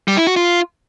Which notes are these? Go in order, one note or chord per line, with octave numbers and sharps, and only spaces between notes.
G3
E4
F#4
F4